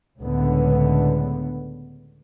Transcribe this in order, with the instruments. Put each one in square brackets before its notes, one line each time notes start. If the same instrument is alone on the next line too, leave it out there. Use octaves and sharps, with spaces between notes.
[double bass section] C#2 A2 D3 B3